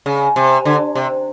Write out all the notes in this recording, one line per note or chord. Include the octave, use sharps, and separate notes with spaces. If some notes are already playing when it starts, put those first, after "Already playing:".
C#3
C3
D3
C3